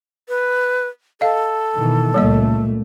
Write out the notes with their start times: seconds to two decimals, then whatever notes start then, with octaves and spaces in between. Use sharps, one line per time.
0.29 B4
1.21 A4 D#5 F5
1.75 B2 D#3 E3
2.14 C#2 A#2 G3 A3 A#3 D#5